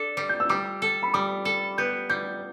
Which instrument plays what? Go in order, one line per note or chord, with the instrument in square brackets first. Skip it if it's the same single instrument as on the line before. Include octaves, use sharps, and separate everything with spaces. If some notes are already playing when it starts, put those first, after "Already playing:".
Already playing: [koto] D4 A4
G3
[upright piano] G6
E6
[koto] G3 [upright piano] D6
[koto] A4
[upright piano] B5
[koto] G3 [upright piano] D6
[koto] A4
[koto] B3 [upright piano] G6
[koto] G3 [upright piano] G6